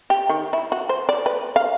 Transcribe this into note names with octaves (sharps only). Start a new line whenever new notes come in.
G4
D#3
E4
F#4
C5
D5
B4
F5